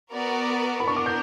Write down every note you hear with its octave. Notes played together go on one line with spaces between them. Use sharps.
B3 F#4 A#4 D5
B5
B3 D4 A#4 C#6
D6
G6